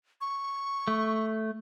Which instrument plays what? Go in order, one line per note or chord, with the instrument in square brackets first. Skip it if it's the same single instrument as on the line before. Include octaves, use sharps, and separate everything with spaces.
[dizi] C#6
[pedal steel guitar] A3